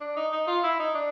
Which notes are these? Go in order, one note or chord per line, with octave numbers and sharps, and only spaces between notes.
D4
D#4
D#4
F4
E4
D#4
D4